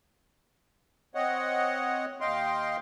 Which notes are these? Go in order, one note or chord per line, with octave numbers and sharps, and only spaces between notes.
C4 C#5 D#5 F#5
D#2 D#5 F5 G5 C6